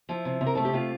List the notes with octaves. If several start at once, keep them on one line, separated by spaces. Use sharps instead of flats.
F3 E4
C3
C3
A#4
A3 A4
G4
C3 F4